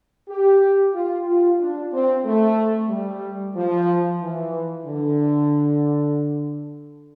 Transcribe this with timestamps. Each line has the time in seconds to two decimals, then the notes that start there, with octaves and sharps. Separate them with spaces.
0.29 G4
0.93 F4
1.27 F4
1.59 D4
1.92 C4
2.25 A3
2.89 G3
3.56 F3
4.21 E3
4.86 D3